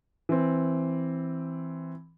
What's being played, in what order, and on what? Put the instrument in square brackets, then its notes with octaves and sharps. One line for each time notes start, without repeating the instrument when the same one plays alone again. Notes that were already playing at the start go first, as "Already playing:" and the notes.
[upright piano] E3 C4